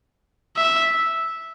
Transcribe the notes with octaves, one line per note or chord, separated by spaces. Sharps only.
E5